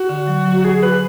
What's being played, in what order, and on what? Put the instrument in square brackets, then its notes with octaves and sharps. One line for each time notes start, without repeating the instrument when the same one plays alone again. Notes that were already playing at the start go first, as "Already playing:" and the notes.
Already playing: [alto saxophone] F#4
[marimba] D3
F#3
F#3
[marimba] F#3 [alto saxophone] G#4
[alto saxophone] B4